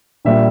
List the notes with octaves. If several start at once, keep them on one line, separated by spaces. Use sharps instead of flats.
A#1 A#2 G3 E5